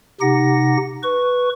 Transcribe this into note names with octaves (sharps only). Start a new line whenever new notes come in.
C3 D#4 G4 F#5 A#6
B4 C#6